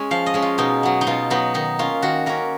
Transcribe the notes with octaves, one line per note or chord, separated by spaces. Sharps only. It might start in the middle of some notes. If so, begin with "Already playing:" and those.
Already playing: G#3 C#4 G#5
F3 F5
D#5
G#3 C#4
F4
B2 D#4
F#3 B3
D#4
B2 F4
F#3 B3 D#4
D#3 D#4
A#3 C#4 F4
D#3 F#4
A#3 C#4 A#4